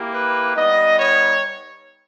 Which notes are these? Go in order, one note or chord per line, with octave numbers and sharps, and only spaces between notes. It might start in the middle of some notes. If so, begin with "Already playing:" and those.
Already playing: A#3 E4 G4
B4
G3 B3 D#4 D#5
C#5